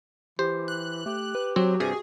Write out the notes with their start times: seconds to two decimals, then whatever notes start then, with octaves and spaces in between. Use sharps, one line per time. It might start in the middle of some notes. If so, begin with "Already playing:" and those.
0.39 E3 G4 C5
0.68 F#6
1.06 A3 G4
1.35 B4
1.56 F#3 C4 F#4
1.80 G2 C3 G#4